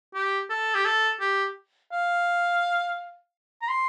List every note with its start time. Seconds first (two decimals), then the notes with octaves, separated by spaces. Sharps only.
0.14 G4
0.50 A4
0.74 G4
0.85 A4
1.20 G4
1.92 F5
3.62 A#5
3.69 C6